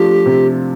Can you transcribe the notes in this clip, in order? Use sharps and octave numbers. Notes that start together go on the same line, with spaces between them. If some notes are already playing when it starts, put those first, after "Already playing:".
Already playing: F3 A3 D4 G4
C3